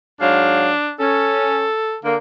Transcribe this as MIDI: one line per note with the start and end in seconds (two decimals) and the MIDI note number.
0.21 0.69 44
0.21 0.69 54
0.21 0.94 62
0.21 0.69 77
0.99 1.64 61
0.99 1.96 69
2.04 2.15 50
2.04 2.15 58